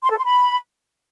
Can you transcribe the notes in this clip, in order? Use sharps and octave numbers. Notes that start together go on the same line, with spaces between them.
C6
A4
C6
B5